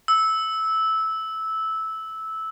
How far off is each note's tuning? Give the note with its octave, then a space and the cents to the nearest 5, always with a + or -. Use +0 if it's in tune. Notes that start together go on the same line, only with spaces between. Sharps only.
E6 -15